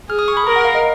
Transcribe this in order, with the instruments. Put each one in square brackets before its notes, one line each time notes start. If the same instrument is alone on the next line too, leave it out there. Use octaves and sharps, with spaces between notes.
[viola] G#4 [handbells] F6
[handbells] D#6
C#6
B5
[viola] A#4 [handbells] A#5
[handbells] F#5
F5
D#5